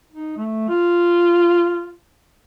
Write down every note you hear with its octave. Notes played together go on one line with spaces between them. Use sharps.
D#4
A3
F4